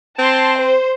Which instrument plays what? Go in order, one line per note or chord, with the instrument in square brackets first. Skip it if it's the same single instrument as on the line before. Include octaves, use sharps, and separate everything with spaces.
[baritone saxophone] C4 [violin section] A5 C6
[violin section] C5